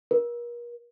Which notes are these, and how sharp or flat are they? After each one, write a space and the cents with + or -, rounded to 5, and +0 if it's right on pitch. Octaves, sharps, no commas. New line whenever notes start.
A#4 +40